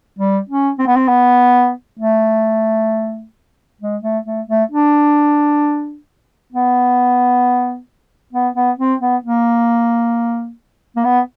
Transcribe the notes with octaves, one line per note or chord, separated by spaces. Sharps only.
G3
C#4
C4
B3
C4
B3
A3
G#3
A3
A3
A3
D4
B3
B3
B3
C4
B3
A#3
A#3
B3